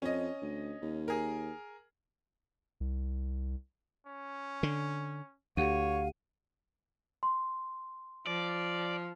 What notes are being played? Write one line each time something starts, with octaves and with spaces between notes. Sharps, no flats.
F2 C#4 D#5
D2
D#2
G#4 A#4
C2
C#4
D3
D2 G4 C#5 F5 F#5 D#7
C6
F3 D5